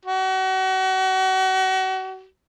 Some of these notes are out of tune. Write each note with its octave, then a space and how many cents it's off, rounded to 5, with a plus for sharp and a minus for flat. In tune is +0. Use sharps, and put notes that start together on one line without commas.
F#4 +35